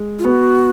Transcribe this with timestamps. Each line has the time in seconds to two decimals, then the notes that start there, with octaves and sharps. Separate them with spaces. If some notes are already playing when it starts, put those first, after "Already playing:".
Already playing: G#3
0.19 F4
0.24 B3 F#4